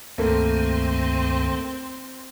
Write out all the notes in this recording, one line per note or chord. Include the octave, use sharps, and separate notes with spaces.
C#2 G2 D#3 A3 A#3 C4